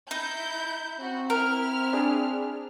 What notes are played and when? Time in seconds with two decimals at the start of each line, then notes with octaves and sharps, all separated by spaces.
0.11 D#4 E4 G6
1.00 C4 F#4
1.30 E4 A#4 F6
1.93 D4 G#4